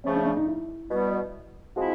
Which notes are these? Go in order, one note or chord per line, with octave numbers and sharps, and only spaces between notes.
C#3 F3 A3 C#4
D4
D4
D#4
E4
B2 G3 B3
F3 G#3 C4 E4 F#4